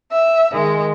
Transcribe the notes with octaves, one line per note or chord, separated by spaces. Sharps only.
E5
D#3 G#3